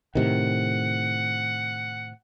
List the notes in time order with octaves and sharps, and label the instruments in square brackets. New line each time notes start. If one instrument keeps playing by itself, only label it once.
[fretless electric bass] A2 C3 D#3 [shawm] F#5